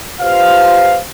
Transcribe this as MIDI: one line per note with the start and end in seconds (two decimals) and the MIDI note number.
0.21 0.99 65
0.21 0.99 67
0.21 0.99 71
0.21 0.99 72
0.21 0.99 77